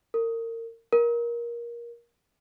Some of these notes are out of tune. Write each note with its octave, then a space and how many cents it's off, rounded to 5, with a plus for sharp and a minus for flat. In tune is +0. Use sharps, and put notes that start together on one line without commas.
A#4 -30
A#4 +20